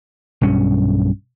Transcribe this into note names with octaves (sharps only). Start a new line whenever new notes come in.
B1 G2 C#4